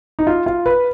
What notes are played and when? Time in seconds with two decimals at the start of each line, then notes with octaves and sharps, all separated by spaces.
0.19 D#4
0.27 F4
0.46 F4
0.66 B4